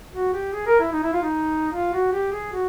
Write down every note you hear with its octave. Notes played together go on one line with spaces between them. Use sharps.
F#4
G4
G#4
A#4
E4
D#4
E4
F4
D#4
F4
F#4
G4
G#4
F#4